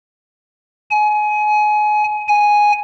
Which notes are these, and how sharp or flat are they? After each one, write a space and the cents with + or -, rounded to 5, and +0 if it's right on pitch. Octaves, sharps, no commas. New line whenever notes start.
G#5 +25
G#5 +0